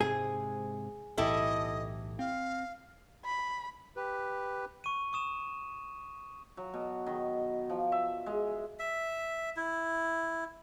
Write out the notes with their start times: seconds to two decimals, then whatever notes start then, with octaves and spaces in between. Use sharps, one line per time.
0.01 G#2 C3 G#3 G#4
1.18 B1 A2 E3 E4 G4 A4 D#5
2.19 C4 F5
3.25 B5
3.96 G4 B4
4.84 C#6 D#7
5.13 C#6 D#6 E7
6.57 F#3
6.74 B2
7.07 D#3
7.70 F3
7.92 E5
8.26 G#3
8.79 E5
9.57 E4